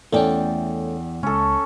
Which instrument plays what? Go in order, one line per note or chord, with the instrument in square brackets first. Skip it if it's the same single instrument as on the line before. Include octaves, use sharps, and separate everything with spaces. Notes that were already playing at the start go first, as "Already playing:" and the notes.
[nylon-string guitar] E2 D5 G5 [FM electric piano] A3 C#4
[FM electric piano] C#2 [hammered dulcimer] C#4 A4